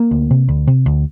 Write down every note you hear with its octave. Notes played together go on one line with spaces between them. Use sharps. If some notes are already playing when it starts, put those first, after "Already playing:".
Already playing: A#3
D2
C3
D2
C3
D2